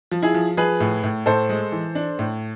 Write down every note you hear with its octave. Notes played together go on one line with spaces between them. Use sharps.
F3
E4 G#4
F3
F3 G#4 B4
A2
A2
A2 A4 C5
G#3
E3
D4
A2